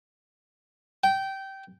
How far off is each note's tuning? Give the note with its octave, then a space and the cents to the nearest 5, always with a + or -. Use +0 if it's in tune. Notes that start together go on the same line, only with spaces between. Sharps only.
G5 -15